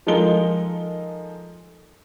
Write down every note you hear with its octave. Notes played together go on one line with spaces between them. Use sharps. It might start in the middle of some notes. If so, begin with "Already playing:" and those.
F3 G#3 D#4 A4 A#4 G7